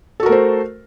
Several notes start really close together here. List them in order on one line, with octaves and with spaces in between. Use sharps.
A4 F#4 A#4 A3 C5